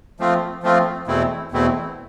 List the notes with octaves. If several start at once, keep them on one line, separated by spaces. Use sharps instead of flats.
F3 A3 C4 F4
F3 A3 C4 F4
E2 B2 A3 C4 E4
E2 B2 A3 C4 E4